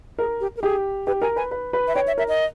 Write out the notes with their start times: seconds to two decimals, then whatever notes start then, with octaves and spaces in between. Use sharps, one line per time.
0.19 G#4 A#4
0.40 G4
0.57 A#4
0.62 G4 G#4
1.07 G4 B4
1.22 A#4 G#5
1.36 B4 G#5
1.51 B4
1.73 B4
1.88 E5
1.95 C#5 G5
2.07 E5
2.18 A#4 E5
2.29 D#5